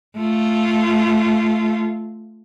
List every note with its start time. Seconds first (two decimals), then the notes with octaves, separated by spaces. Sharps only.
0.17 A3 F4